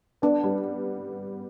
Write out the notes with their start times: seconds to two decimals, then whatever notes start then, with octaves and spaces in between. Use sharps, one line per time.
0.22 B3 D4
0.43 G3